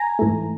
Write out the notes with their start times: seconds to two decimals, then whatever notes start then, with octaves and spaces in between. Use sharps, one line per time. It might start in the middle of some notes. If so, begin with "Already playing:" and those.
Already playing: G#5 A#5
0.19 G#2 E3 A3